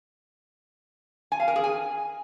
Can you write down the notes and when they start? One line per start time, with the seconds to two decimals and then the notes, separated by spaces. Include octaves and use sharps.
1.32 G#5
1.40 F5
1.48 A#4
1.56 G#4
1.64 G#5